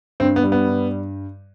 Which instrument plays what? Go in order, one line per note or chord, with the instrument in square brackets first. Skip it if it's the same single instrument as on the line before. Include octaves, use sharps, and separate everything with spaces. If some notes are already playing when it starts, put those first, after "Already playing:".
[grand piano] G2 [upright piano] C4
[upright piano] B3
[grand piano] G3
[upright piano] B3
[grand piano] G2